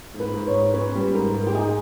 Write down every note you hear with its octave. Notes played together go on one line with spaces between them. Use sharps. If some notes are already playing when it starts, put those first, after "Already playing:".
G#2
B4
G#2
C#5
G#2
C#4 B4
G3
G#2 A#4
G#2
G4
D#4 G#4